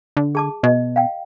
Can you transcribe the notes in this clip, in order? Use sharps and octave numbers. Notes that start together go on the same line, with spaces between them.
D3
G#4 A5 D6
B2 D#5
F5 G5